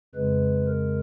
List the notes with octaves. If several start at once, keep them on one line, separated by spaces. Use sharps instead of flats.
F2 C#3 G#3 B4
A#4